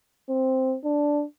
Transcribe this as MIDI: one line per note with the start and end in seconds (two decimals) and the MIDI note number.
0.29 0.76 60
0.85 1.24 62